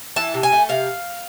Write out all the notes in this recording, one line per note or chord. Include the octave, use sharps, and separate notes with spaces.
E3 A5
C3
G#5
A3
C3 F5